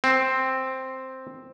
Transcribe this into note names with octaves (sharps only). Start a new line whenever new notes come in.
C4